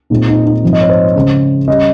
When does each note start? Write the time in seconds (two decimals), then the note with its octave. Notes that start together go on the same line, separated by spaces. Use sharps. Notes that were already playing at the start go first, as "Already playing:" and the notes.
0.10 A#2 G#3 C4 D#4
0.28 D#4
0.46 D#4
0.62 G#2 F3 C4
0.73 D#5
0.81 C#5
0.89 C5
1.15 C#3 G#3 C#4
1.68 G3 C#4 D#5